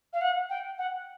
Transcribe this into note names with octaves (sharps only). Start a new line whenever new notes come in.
F5
F#5
G5
F#5